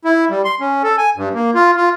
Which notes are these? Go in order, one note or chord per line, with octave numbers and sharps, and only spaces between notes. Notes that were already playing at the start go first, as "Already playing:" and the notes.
E4
G3
C6
C#4
A4
G#5
G2
A#3
F4
F4